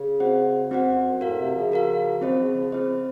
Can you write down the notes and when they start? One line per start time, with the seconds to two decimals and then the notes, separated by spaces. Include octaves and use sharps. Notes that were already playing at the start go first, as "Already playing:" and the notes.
Already playing: C#3
0.20 C4 F#4 C5 F#5
0.71 F#2 C4 F#4 C5 F#5
0.87 F2
1.05 F#2
1.21 A2 F#4 A#4 F5
1.38 C3
1.55 C#3 F3
1.72 F#4 A#4 F5
2.21 D#3 F#3 C4 F4 C5 D#5
2.38 C#3 F3
2.55 C#3 F3
2.72 C#3 C4 F4 C5 D#5